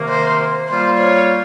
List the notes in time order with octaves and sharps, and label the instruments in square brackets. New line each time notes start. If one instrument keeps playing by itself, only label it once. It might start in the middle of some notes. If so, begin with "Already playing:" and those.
Already playing: [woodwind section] C3 D#3 A#3
[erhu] C5
[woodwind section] A#2 G3 A#3 F4 [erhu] C5
[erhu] C#5